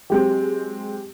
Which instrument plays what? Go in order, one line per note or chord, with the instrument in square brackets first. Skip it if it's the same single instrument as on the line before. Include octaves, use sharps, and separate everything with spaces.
[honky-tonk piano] F#3 G#3 C4 [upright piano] G4